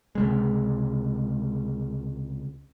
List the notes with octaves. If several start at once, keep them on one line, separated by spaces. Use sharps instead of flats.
C#2 C3 G#3